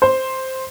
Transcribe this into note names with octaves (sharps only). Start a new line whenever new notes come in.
C5